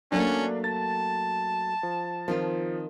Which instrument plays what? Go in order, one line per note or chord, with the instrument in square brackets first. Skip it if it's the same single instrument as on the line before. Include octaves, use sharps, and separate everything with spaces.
[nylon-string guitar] F#3 A3 A#3 [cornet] C#4 [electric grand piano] D4
[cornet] A5 [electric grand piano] A6
[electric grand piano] F3
[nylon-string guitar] D#3 C4 F4 [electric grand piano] F3